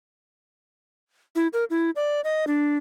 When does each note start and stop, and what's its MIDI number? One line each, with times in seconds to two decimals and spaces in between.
1.36 1.47 64
1.53 1.64 70
1.70 1.90 64
1.96 2.21 74
2.24 2.45 75
2.47 2.77 62